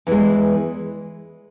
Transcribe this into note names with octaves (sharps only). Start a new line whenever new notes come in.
E2 E3 G#3